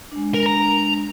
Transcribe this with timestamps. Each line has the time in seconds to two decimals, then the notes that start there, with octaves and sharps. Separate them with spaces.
0.12 G#3 D4
0.34 A#4
0.46 A#5